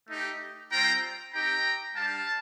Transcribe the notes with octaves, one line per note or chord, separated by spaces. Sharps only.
A3 D#4 G4
G3 C4 F4 G5 A#5
C4 D#4 G4 G5 A#5
G3 D4 G4 F5 A5